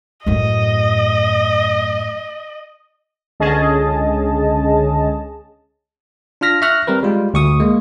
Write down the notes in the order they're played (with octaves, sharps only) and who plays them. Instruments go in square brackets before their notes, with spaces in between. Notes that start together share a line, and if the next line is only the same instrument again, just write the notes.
[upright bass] F#2 A2 [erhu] D#5
[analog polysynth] C#2 D3 C#4 G#4 D#5 A5
[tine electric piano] D4 F4 F6 A#6 B6
E5 C#6 F6 F#6 A#6
G3 C4 A#4 B4
G3 G#3 F4
D2 C#6 D#6
G#3 A#3